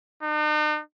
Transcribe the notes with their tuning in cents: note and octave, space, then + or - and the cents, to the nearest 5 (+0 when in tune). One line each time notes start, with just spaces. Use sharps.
D#4 -45